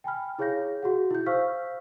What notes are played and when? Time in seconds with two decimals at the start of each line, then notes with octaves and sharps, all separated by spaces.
0.04 G5 G#5 B5 F6
0.39 E4 G#4 C#5 F5 G6 A#6
0.83 F#4 G#4 F#5
1.11 E4 G6
1.26 C5 F5 C#6 E6 F6 B6